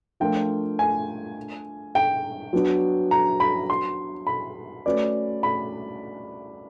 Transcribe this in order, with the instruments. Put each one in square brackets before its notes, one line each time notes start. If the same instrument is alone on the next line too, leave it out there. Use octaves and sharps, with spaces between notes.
[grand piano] F3 A3 D4 F4 A#4 [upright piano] G5
[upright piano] G#5
G5
[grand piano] F#3 B3 D4 F#4
[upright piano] A#5
B5
C6
B5
[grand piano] A3 C#4 F#4 B4 D5
[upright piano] B5